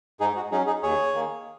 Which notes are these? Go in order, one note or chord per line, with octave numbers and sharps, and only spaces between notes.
G#2 D#4 G#4
F#4
F#3 C#4 D#4 G#4
D#4 G#4
D#2 G#4 C#5
D#3 A#3